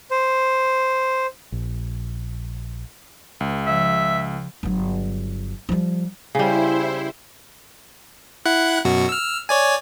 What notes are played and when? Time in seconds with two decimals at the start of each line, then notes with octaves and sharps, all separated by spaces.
0.11 C5
1.52 A#1
3.40 C#2
3.66 C#3 F3 E5
4.63 G1 F#3
5.69 F3 G3
6.35 C#3 G3 E4 C5
8.46 E4 F#5 F#6
8.85 F#2 B2 F#4
9.09 E6 F6
9.49 C#5 D5 G#5